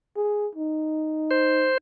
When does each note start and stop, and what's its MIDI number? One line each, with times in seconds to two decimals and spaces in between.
0.17 0.48 68
0.55 1.73 63
1.31 1.78 72